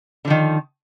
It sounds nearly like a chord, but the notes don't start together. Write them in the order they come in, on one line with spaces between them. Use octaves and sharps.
D3 F3 D#3